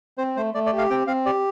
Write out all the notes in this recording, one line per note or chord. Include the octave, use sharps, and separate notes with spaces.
C4 C5
A3 C5
A3 D5
D5
G4
F5
C4 G5
C4 F5
G4 D5